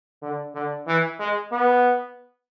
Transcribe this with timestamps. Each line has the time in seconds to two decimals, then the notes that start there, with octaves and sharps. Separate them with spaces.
0.22 D3
0.55 D3
0.87 E3
1.19 G#3
1.52 B3